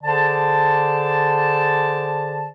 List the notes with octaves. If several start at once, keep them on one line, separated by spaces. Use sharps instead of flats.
D3 G#4 C5 D5 A5